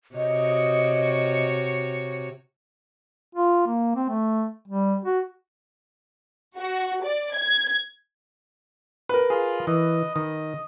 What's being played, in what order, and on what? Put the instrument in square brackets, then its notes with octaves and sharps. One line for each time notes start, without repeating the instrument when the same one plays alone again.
[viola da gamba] C3 F#4 C#5 [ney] D#5
[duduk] F4
A#3
C4
A3
G3
F#4
[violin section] F#4
D5
G#6
[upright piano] A#4 B4
[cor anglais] F4 [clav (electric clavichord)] G#4
[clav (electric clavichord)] E3 [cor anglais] D#5
[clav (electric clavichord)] D#3 [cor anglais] D#5